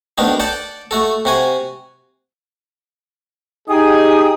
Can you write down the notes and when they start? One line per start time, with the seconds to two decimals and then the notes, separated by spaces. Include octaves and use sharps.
0.18 D2 D#3 B3 D4 D#4
0.40 D5 F#5 G5 A5
0.91 A3 F#4 A4
1.25 C3 F#4 G#5
3.69 D#4 G4 G#4 G5 G#5 D#6